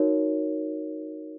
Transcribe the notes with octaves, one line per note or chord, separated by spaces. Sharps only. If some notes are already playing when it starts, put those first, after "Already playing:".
Already playing: D#4 F#4 A#4 C#5